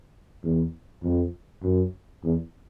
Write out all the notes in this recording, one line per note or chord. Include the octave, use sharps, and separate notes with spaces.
E2
F2
F#2
E2